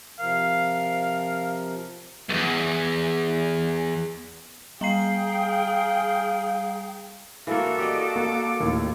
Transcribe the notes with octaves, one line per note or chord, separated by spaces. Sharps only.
C3 F3 A#4 F5
B1 E2
G3 G#4 F5 G5 A#5 C7
E3 A#3 F#4 A4 F5
G4 D5 D#5 D6
A#3
D#2 A2